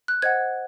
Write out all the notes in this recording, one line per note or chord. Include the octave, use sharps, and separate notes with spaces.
F#6
C5 D#5 F#5 G#6